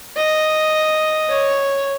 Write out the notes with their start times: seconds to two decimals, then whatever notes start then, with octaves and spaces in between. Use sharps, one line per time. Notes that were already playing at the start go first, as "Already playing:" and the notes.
0.16 D#5
1.29 C#5